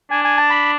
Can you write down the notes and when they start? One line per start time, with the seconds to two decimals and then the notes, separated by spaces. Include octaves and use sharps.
0.11 D4 G#5
0.25 G#5
0.37 A5
0.50 B5